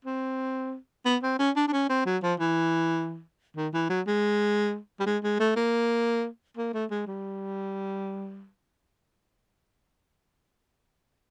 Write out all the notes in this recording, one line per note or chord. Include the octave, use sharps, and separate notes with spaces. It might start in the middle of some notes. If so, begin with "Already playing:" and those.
C4
B3
C4
C#4
D4
D4
C#4
C4
F#3
F3
E3
D#3
E3
F#3
G#3
G3
G#3
G#3
A3
A#3
A#3
A3
G#3
G3